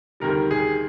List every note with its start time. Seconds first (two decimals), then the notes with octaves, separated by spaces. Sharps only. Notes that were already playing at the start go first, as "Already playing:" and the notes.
0.20 D2 C3 D#3 G3 A#4
0.51 G#4